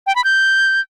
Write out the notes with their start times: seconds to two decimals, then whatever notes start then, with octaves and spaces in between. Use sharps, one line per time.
0.07 G5
0.16 B5
0.24 G6